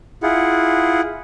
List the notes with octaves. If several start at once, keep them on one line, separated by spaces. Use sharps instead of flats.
E4 F4 G#4 F#5